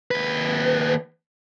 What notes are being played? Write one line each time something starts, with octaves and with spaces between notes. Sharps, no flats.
D#2 B4